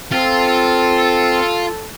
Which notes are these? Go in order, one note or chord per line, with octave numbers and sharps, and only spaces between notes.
C4 F4 A4